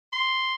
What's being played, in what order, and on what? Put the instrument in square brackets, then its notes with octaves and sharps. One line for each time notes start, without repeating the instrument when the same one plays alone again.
[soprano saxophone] C6